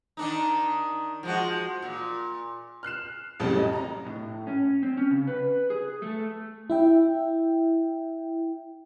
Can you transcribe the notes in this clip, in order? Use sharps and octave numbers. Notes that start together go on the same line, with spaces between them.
D#3 D4 D#4
F3 G#3 F#4
A#2
F6 F#6 C7 E7
A1 F2 A2 C#3 F#3 G3
D#5
A#5
A2
C#4
C4
C#4
C#3
B4
G#4
A3
E4 E5 G5